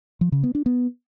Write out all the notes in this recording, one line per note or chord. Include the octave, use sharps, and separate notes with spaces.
F3
C#3
B3
D4
B3